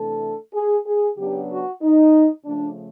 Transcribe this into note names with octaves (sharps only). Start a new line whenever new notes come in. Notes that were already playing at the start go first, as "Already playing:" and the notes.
Already playing: C3 E3 A3 D4 A4
G#4
G#4
C#3 F#3 B3 D4 G4
F#4
D#4
C#3 F3 A3 D4